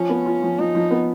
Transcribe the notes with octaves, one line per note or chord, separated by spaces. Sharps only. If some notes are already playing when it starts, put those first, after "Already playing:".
Already playing: F3 C#4
B3
F4
F3
F3 D#4
F3
B3